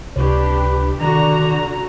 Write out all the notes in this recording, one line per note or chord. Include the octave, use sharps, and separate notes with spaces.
C#2 C3 D4 G4 B4 C#5
D3 D#3 F#4 D5 A#5